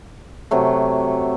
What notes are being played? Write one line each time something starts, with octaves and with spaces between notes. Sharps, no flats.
C3 F#3 A3